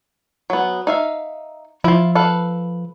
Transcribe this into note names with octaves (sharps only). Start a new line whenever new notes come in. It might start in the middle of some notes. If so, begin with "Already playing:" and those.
F#3 B3
D#4 E5 F5
F3 E4 F4
A4 B4 F5